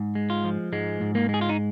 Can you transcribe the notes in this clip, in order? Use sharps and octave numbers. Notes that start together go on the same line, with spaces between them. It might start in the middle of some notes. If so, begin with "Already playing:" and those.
Already playing: G#2
G#3
F4
F3
G#2 G#3
G#2
A#3
G#3 G#4
F4
D#4